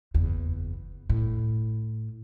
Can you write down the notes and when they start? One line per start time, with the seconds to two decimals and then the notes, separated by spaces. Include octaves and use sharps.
0.14 F#1 E2
1.09 A2